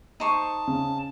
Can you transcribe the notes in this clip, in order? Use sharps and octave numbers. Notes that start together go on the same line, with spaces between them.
D#4 C5 A5 C#6
C#3